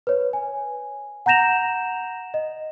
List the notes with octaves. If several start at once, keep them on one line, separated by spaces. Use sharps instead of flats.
B4 C#5
G#5
F#5 A#5 G6 A#6 E7 F7
D#5